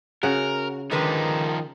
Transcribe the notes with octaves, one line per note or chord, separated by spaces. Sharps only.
C#3 F#4 A#4 F#5
D3 D#3 F3 G#3 D#4 B4